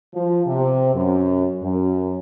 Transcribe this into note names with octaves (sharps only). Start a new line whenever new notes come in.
F3
C3
F#2
F#2